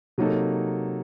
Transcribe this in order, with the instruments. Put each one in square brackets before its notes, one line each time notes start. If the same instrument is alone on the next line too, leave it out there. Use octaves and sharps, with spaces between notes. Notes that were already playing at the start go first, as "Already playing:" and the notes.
[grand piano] C3 F#3 A#3 D#4 A4